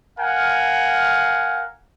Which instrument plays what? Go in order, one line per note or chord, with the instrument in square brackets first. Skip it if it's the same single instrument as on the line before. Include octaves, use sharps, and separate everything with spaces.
[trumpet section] A#4 F5 F#5 G#5